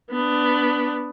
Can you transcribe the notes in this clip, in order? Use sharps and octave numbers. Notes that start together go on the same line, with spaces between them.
B3 D4